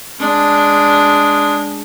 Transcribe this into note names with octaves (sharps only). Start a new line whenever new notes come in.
G#3 D4